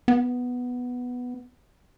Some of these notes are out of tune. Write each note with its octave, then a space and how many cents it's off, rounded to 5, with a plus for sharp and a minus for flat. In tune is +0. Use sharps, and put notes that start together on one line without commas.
B3 +0